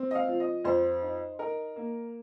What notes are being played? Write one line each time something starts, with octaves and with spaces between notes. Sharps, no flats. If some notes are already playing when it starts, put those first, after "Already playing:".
Already playing: C4
D#5
F5
F3
D#5
F2 C5
D#4
D#4 A#4
A#3